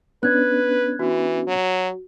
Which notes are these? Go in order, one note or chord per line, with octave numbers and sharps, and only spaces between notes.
B3 C#4 D4 B4 F#6 G#6
E3 F#4
F#3